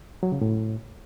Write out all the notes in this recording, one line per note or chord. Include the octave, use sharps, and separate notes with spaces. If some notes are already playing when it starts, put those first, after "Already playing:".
F#3
C#3
A2